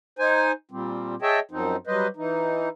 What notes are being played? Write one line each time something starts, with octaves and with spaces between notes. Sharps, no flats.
D#4 C5 G#5
A#2 G3 C4
G#4 C#5 D#5 E5 G5 A5
F#2 F3 C4 D#4
F#3 G3 B4 C5 D#5
E3 D#4